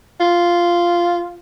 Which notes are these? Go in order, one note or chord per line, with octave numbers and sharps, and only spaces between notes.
F4